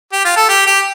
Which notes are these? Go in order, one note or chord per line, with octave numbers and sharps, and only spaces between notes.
G4
F4
A4
G4
G4